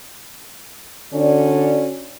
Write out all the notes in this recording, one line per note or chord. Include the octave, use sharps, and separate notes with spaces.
D3 C#4 F#4 D5